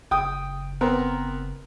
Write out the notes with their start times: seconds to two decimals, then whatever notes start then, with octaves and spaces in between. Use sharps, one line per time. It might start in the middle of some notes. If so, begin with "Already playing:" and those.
0.11 F#1 G5 D#6
0.81 B3 C4 A#4